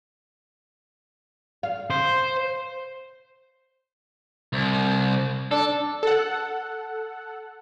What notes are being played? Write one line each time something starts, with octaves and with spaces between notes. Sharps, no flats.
F5
C5
C2
D4 A4
A4 F#5